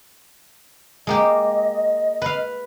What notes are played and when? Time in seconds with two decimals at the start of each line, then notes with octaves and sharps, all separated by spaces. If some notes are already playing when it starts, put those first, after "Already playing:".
1.07 G#3 A#3 G4 D#5
2.22 B4 F5